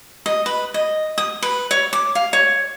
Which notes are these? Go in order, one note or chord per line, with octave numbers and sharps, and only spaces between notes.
D#5
B4
D#5
D#6
B4
C#5
D6
F5
C#5